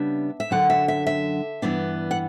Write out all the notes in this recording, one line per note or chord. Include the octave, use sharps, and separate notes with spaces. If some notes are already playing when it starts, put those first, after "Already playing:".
Already playing: C#3 G3 B3 D4 E5
E5
F#2 D3 F#3 F#5
E5
E5
E5
G2 E3 B3 D4
F#5